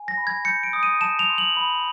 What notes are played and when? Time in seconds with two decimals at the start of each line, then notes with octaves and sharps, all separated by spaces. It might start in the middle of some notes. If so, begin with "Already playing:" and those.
Already playing: G#5
0.08 A#6
0.17 B5
0.27 G#6
0.45 G6 C#7
0.63 D7
0.73 D#6
0.83 D#7
1.01 A5 E7
1.19 F7
1.30 C6
1.38 F#7
1.57 B5